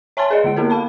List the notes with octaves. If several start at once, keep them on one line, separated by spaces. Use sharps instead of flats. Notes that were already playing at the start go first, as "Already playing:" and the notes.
C#5 E5 G#5 A5 C6 A6
G#4 B4 D5 D#5
D3 G#3 D7
A#3 B3 E4 F#4 A4 A#4
F5 A5 B5